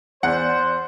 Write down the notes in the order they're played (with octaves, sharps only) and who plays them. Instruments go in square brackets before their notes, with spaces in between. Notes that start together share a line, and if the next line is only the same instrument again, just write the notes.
[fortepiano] E2 [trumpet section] C5 [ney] D5 [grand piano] F#5